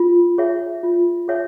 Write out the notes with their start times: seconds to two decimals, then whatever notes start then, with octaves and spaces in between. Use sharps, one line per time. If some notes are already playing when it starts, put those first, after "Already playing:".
Already playing: F4
0.38 G#4 C#5 E5 G#5
0.83 F4
1.28 G#4 C#5 E5 G#5